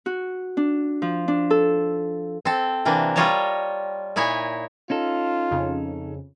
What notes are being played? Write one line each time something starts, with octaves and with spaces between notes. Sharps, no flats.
F#4
D4
F3
D4
A4
C4 A4
C3 E3 A#3 D4
G3 F4 C#5 D#5 A5 A#5
A#2 D#4 E4 C#5 G#5
C#4 D#4 F4 A4
F2 C#3